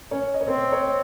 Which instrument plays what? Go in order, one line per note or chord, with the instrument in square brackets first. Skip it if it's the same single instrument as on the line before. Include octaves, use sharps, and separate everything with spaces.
[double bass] C#4 [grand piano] C#5
[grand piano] D#5
C#5
[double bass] C4 [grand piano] C5
[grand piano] C#5